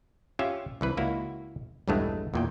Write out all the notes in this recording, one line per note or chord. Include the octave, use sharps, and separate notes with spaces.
C#4 F4 G4 E5 F5
C2 E3 B4
C#2 A#3 E4 F#4
B1 E2 G2 G#3 A3
E2 A#2 G5